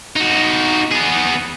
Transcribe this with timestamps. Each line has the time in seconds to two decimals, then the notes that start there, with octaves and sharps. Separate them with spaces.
0.16 D#4 F#4
0.91 B3 G#4